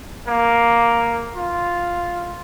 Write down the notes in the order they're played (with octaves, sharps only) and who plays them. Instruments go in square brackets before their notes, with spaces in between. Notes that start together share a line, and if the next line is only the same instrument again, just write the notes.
[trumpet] A#3
F4